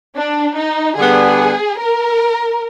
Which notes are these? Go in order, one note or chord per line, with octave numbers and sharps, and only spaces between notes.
D4
D#4
D3 G3 B3 D4 G#4
A#4